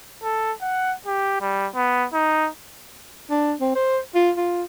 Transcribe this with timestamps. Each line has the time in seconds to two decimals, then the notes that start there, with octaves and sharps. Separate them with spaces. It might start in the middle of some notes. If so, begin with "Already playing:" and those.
0.23 A4
0.62 F#5
1.06 G4
1.41 G3
1.75 B3
2.14 D#4
3.31 D4
3.61 C4
3.75 C5
4.15 F4
4.37 F4